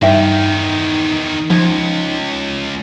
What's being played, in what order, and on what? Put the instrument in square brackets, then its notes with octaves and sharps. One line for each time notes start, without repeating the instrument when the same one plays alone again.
[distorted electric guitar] E2 D#3 [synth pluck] G2 [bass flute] D#4 [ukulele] E5 G5
[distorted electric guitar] C#2 [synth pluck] F3